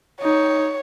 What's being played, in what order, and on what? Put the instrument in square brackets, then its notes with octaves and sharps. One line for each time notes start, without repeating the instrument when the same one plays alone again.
[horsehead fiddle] D#4 [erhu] C#5